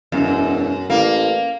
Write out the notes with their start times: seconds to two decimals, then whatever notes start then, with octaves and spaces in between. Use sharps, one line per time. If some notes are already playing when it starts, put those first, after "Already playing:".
0.12 E1 F#2
0.90 A1 A#3